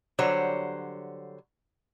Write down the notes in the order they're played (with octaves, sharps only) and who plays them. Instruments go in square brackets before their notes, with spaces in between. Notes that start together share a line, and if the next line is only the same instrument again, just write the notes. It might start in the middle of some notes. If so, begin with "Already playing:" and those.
[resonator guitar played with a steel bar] D3 F#3 G3 C5 C#5